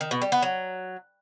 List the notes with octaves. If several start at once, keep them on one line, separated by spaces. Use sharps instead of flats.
D#3
B2
G3
B3
F#3